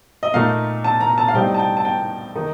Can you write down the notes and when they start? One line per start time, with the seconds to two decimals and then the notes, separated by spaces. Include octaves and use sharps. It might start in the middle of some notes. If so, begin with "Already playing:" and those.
0.23 D#5
0.34 A#2 A3 D#4 F5
0.84 A5
1.01 A#5
1.18 A5
1.28 F5
1.34 A2 G3 C4 D#4 G5
1.54 A5
1.59 G5
1.77 A5
1.85 G5
2.35 D#3 A#3 D#4